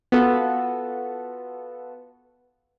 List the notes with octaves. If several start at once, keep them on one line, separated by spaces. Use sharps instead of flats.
B3 F4 F#4 A4